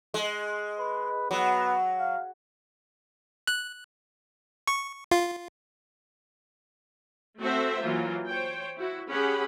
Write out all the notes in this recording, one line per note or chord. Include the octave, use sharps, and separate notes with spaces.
G#3
B4
F#3 B3
F5
F#6
C#6
F4
A3 C4 F#4 A4 C5 E5
E3 F#3 A#3 F4
C5 C#5 G5
E4 F#4
C#4 G4 G#4 F#5 B5